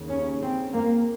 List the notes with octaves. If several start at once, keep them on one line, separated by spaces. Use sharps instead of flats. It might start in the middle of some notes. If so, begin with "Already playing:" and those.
Already playing: D#2 C#3
C#4
C4
A#3